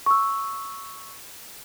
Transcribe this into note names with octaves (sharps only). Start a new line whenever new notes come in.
C#6 E6